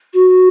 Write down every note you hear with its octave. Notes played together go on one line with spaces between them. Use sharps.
F#4